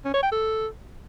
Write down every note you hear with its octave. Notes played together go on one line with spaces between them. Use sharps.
C#4
C#5
G5
A4